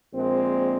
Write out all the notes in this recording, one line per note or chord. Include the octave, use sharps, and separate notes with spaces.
A#1 A#2 G#3 C4